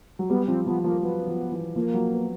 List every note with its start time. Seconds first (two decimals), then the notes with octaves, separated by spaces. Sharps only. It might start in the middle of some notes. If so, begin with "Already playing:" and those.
0.19 F#3
0.30 G3 B3
0.48 F3 C4
0.66 F3 B3
0.84 F3 A#3
1.02 F#3 B3
1.27 F3
1.52 E3
1.75 F3 A#3
1.94 F#3
2.12 B3